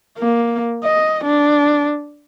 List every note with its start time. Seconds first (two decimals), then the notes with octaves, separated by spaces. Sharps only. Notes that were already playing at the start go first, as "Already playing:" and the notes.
0.18 A#3
0.84 D#5
1.24 D4